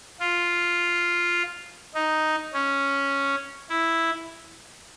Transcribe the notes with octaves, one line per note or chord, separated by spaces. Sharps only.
F4
D#4
C#4
E4